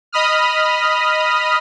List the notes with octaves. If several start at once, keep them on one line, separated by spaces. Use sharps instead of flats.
D#5 B5 D#6 F6